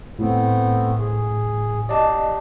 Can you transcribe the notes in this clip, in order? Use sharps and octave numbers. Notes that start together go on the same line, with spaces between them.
A2 A3 B3 C4
G#4
G4 D5 D#5 A5